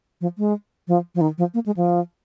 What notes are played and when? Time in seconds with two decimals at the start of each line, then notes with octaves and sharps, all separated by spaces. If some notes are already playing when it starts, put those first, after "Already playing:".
0.21 F3
0.38 G#3
0.88 F3
1.15 F3
1.21 D#3
1.38 F3
1.54 A#3
1.66 G#3
1.77 F3